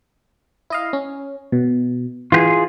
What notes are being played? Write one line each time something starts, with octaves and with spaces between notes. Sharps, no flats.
E4 D#5 F5
C#4
B2
E3 F4 G4 G#4